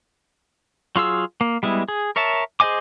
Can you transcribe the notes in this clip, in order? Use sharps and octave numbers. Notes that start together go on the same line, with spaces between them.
F#3 F4 G#4 E6
A#3
G3 G#3 B3 E4
G#4
A#4 C#5 E5 A5
G#4 C5 D#5 G#5 D6